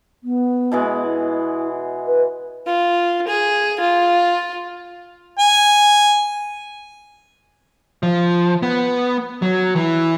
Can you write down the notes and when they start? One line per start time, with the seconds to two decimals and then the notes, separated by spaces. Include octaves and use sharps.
0.24 B3
0.72 B2 E3 G#3
1.02 E4
2.07 B4
2.67 F4
3.28 G#4
3.80 F4
5.39 G#5
8.03 F3
8.62 B3
9.42 F#3
9.76 E3